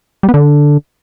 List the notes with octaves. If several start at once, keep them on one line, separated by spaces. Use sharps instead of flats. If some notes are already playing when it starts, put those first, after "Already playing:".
G3
B3
D3